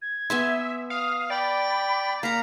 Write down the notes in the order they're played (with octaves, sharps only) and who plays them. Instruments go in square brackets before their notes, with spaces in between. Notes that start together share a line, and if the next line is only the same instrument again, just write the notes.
[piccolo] G#6
[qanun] B3 G#5 C6 [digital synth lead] E5
[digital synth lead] F5 [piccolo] D#6
[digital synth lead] D5 [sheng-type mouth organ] G5 [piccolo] B5
[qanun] A#3 F#5 [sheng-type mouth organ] F5 A#5 [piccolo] B6